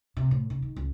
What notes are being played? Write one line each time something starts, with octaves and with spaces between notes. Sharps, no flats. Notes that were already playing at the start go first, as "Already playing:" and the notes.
C3
A2
C#3
D#3
C#2